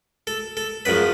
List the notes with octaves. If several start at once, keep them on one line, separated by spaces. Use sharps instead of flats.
A4
A4
F#2 C#3 F3 B4